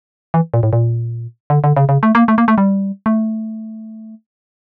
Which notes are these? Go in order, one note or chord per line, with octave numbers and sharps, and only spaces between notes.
E3
A#2
A2
A#2
D3
D3
C#3
C#3
A3
A#3
A3
A#3
A3
G3
A3